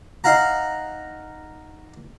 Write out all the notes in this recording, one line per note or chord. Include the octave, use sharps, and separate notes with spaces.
D#4 F5 F#5 A#5